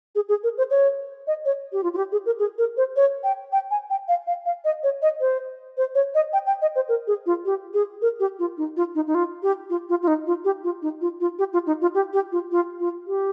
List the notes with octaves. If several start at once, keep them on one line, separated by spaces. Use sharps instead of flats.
G#4
G#4
A#4
C5
C#5
D#5
C#5
G4
F4
F4
G4
G#4
A#4
G#4
A#4
C5
C#5
G5
G5
G#5
G5
F5
F5
F5
D#5
C#5
D#5
C5
C5
C#5
D#5
G5
G5
D#5
C5
A#4
G#4
F4
G4
G#4
A#4
G4
F4
D#4
F4
D#4
D#4
F4
G4
F4
F4
F4
D#4
F4
G4
F4
D#4
F4
F4
G4
F4
D#4
F4
G4
G4
F4
F4
F4
G4